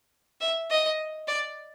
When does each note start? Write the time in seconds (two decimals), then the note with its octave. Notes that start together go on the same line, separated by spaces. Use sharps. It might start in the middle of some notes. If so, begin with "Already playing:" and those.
0.41 E5
0.70 D#5
1.28 D5